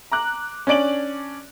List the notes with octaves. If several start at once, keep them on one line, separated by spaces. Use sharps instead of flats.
A#5 D6 F#6
C#4 D4 D5 D7 F#7